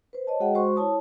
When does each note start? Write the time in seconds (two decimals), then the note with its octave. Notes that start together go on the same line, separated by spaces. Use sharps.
0.13 B4 C5
0.27 C#5 D#5 A5
0.40 G#3 F#4 G#4 D#5 F#5 G5
0.55 G#3 F#4 C5 C6 C#6
0.76 E4 C#5 A5 D#6